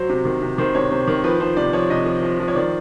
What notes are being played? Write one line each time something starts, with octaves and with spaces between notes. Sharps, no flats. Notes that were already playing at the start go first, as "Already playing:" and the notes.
Already playing: F#3 C5
C3
D#3
C3
D#3 C5
C3 C#5
C3 C5
D#3
F3 B4
F3 C5
C3 D5
F3 C#5
C3 D#5
F3
F3
F3
C#5
D#3 D5